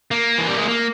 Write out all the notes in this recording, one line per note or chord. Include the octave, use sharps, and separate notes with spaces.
A#3
E3
G3
G#3
A#3